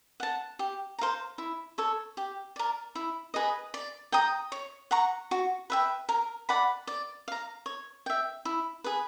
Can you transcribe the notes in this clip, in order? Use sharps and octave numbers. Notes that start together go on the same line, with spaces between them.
F#5 A5
G4
C5 F5 A#5
E4
A4 C#5
G4
A#4 D5
E4
G#4 B4 D#5
D5
G5 A#5 D#6
C#5
F#5 A#5 C#6
F#4
B4 E5 G5
A#4
D5 F#5 B5
D5
F5 A#5
C#5
E5 G5
E4
G#4 B4